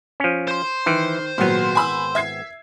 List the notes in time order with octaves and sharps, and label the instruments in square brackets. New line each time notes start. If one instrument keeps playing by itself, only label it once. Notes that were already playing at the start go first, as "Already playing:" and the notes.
[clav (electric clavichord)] F3 C#4
[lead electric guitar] C5 C6
[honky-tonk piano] D#3 [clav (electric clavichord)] E3
[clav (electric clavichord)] G#1 B3 [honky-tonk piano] A#2 F#3
[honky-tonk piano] G#5 B5 E6
E5 G#6 C7